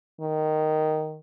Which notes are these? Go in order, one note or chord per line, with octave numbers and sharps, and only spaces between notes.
D#3